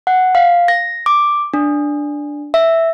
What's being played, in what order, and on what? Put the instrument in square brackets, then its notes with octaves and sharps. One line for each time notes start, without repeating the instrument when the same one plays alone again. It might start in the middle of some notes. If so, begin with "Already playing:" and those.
[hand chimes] F#5
F5
A#6
D6
D4
E5